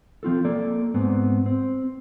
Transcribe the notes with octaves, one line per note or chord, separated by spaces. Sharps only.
F3 C4 F4 A4
A#3 A4 D5
G#2 B3 C4
C4